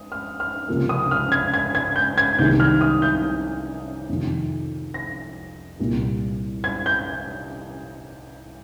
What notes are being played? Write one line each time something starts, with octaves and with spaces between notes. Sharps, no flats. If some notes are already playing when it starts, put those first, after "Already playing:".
Already playing: D#6
F6
F6
C#2 C3 F3 A#3
D#6
F6
G#6
G#6
G#6
G6
G#6
C2 C3 D#3 G#3 G6
F6
D#6
G6
F2 C3 D#3
A#6
C2 A#2 G3 A#3
G#6
G6